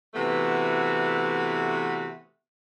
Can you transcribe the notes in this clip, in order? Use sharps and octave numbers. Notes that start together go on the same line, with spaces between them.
C3 E3 A3 B3 F#4